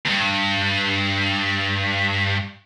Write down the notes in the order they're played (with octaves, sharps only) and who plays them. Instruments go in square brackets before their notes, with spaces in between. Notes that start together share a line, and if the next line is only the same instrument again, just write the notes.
[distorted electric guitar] E2 G2